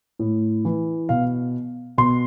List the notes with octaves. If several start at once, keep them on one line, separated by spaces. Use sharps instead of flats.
A2
E3
B2 F5
B2 C6